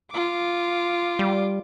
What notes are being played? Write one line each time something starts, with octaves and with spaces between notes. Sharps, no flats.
F4 D6
G3